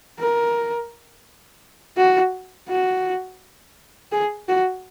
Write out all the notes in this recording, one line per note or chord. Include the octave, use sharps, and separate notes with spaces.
A#4
F#4
F#4
G#4
F#4